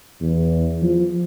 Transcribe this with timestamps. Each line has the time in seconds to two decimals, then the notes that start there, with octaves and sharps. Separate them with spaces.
0.21 E2
0.82 F3